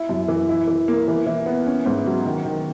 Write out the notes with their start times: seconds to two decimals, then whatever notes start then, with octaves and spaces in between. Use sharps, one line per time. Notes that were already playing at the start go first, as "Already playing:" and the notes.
Already playing: E4
0.09 F#2
0.28 E3
0.49 E4
0.68 E3
0.88 A#3
1.08 E3
1.26 E3
1.46 B3
1.67 C#4
1.86 G#2
2.06 F#3
2.25 D#3
2.45 D#3